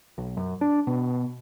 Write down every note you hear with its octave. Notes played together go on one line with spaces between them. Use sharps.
B1
F#2
D4
B2